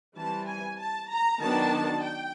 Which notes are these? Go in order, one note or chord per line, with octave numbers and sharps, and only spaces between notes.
E3 G3 C4 A5
G#5
A5
A#5
D#3 F#3 B3 D4 A5
G5